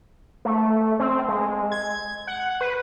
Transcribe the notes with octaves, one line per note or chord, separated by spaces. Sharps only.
A3
C4
G#3
G#6
F#5
B4